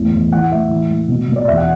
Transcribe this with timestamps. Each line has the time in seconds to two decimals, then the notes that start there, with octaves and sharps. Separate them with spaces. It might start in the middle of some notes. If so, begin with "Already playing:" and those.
Already playing: E2 A2
0.12 E2
0.32 E3 F#5
0.51 A2 E5
0.70 E3
0.90 A2
1.08 B2
1.28 B2
1.36 D5
1.48 E2 E5
1.58 F#5